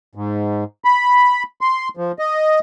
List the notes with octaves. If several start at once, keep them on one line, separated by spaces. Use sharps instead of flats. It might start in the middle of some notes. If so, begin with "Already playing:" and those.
G#2
B5
C6
F3
D#5